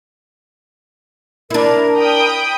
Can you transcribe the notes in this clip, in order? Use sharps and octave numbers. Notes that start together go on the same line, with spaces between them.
D4 E4 A#4
G5 B5 D#6